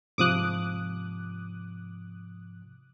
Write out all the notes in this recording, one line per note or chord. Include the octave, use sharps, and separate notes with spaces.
G#2 C3 F3 D6 D#6 F#6